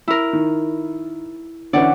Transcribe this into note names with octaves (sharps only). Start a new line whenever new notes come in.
E4 A#4
D#3
D3 E3 C#4 D5 F#5